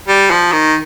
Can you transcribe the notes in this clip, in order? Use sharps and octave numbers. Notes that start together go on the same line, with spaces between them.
G3
F3
D#3